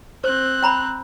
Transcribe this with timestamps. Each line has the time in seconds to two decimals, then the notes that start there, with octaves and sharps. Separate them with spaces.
0.24 C4 C5 F#6
0.63 G5 A#5 B5